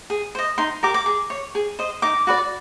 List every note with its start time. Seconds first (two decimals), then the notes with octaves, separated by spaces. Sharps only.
0.10 G#4
0.35 C5 D#5
0.58 D#4 C6
0.83 G4 A#4 D6
0.94 D6
1.06 G#4
1.30 C#5
1.55 G#4
1.79 C5 D#5
2.02 D#4 D6
2.27 F#4 B4 D5